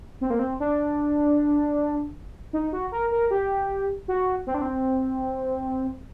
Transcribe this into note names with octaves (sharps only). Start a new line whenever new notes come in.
C4
A#3
C4
D4
D#4
F#4
A#4
A#4
G4
F#4
C4
D4
C4